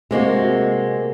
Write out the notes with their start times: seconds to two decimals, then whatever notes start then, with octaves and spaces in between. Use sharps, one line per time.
0.11 C3 G#3 A#3 F#4